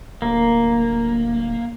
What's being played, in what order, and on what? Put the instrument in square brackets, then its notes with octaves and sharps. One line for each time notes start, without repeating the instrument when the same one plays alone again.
[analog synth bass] D1 [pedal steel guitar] A#3